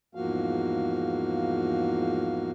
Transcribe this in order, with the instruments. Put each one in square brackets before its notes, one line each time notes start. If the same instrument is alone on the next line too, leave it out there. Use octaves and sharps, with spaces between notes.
[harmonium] E2 G#2 F3 A#3 F#4 F5